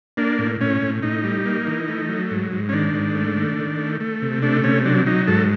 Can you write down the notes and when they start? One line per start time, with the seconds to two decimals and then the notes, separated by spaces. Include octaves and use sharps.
0.17 A#3 D4
0.39 A2
0.61 A2 C#4
0.82 A2
1.03 A2 D#4
1.24 G3
1.46 A#3
1.67 E3
1.88 A3
2.09 F#3
2.31 G#2
2.52 G#2
2.69 C#4
2.72 D#3 D4
2.94 G#2
3.15 A3
3.37 D#3
3.58 D#3
3.79 A3
4.00 A3
4.22 C3
4.42 A3 D4
4.64 C3 C#4
4.85 F#3 D4
5.06 F#3 D#4
5.27 G#2 A4